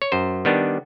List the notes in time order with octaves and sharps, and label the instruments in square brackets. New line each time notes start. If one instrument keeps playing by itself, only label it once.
[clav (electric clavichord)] C#5
F#2 C5
D#3 G3 B3 D4